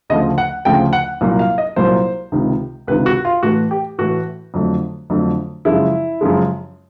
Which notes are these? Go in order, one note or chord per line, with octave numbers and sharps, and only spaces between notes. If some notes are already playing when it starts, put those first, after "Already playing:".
D2 C#3 F3 A3 D#5
F#5
D2 C#3 F3 A3 G5
F#5
C2 A#2 F#3 A#3
F5
D#5
C2 A#2 F#3 A#3 C5
C#2 C3 D#3
C#2 C3 D#3 B4
F#4
F4
A2 E3 A3 F#4
G4
A2 E3 A3 F#4
F2 D3 F#3 A3
F2 D3 F#3 A3
F#2 C#3 F3 G#3 E4
F#2 C#3 F3 G#3